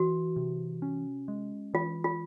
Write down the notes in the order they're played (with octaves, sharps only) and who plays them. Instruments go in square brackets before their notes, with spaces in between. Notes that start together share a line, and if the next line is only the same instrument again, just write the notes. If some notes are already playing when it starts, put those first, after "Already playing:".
Already playing: [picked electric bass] E3 [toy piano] F#4
[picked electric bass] C3
C#4
G#3
[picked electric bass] E3 [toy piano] F4
[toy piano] F4